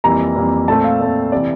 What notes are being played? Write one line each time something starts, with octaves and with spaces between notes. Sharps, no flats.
F2 E3 G3 A#3 A#5
F2 E3 G3 A#3
A#2 A3 C4 A5
F5
A#2 A3 C4
C3 E3 D5